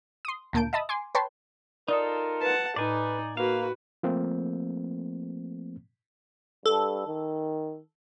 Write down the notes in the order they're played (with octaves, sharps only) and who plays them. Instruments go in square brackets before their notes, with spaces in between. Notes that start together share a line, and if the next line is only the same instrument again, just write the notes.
[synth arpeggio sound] C6 D#6
D2 A#2 A#3 A5 G6 D7
D#5 E5 A5 B5 D#6
G#5 C6 D6
B4 C#5 G5 A5 C6
[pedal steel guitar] D#4 F4 A4 [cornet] A#4 [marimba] D5 D#6
[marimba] B4 [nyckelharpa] F#5 A5
[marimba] A2 [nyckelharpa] D#4 [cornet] B4 [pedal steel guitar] D5 G#5
[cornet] A#3 [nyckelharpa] F#4 B4 [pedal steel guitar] F5
[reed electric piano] F3 A3 A#3 C4
[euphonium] G2 [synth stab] A4
[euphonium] D#3